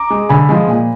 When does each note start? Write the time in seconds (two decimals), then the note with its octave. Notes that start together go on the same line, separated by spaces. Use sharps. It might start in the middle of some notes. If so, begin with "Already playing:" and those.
Already playing: A#5 D6
0.10 G#3
0.29 D3 G#5 B5
0.49 F3 G#3
0.67 A#2